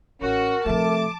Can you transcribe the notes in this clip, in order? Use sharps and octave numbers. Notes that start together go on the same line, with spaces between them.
A1 C#4 F#4 A#4
C3 F3 A3 A5 D6